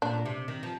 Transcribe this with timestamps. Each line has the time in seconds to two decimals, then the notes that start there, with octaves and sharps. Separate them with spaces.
0.02 A#2 D4
0.25 C3
0.48 D#3
0.63 F3